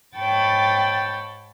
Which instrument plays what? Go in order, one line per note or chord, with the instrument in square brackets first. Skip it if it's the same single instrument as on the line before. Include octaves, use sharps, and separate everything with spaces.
[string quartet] G#2 C#5 G5 A5 B5 A6